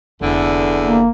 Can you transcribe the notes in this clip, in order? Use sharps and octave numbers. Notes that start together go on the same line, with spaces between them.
F1 E2 D3
A#3